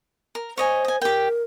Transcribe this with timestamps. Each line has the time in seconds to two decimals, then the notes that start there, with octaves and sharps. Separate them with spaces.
0.35 A#4
0.57 C5 C#5 D#5 G#5
0.85 D#5 G#5
1.01 G4 A#4 G5